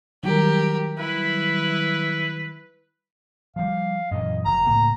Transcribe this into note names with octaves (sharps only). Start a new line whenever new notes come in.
D#3 F#3 G3 G4 A#4
E4 B4
F3 G3 F5
F#2 A#2 E3 D#5
F1 A#5
C#2 A2 A#3